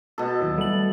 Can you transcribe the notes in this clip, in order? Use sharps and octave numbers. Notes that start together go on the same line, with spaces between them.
B2 A4
D#2 E3 F#3
G3 A3 F#7